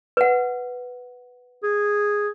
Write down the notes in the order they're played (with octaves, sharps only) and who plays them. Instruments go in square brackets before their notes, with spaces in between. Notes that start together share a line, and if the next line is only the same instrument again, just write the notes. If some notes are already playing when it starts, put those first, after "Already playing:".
[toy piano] B4 F#5
[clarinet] G#4